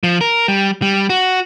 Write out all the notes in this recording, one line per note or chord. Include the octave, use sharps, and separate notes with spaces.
F3
A#4
G3
G3
F#4